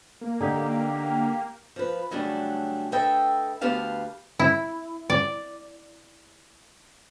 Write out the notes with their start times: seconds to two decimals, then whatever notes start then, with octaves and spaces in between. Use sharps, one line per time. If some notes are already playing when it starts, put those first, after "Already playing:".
0.21 A#3
0.41 D3 D#4 G4
1.76 F3 B4
2.11 C#3 F#3 G3 A3 D4
2.92 A4 B4 D#5 E5 G5
3.61 D2 B3 G4 B4 F5 A5
4.39 E4
5.10 D5